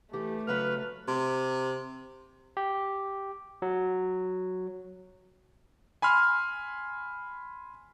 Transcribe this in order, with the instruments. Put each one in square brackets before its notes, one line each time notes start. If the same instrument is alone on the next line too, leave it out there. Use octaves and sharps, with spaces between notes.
[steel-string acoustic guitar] E3 A4 [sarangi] A3 [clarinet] G4
[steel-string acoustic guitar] C#3 F#3 C#4 [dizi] B4 [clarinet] F6
[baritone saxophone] C3
[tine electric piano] G4
F#3
[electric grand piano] G#5 B5 C6 F6